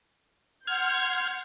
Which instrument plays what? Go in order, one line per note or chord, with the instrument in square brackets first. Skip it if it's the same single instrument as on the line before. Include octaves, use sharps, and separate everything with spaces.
[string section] F#5 C6 G6 [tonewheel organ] F6 G#6